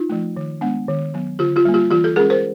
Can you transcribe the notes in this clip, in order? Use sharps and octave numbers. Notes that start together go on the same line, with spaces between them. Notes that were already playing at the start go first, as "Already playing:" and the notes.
Already playing: D#4 F4
F3 A3
D#3
G#3 B3 D4
D#3
F#3 B3
D3 F4 G4
F4 G4
G3 A#3
F4 G4
E3 F4 G4
G4 A4
G#3 C#4 G#4 A#4
A#4 C5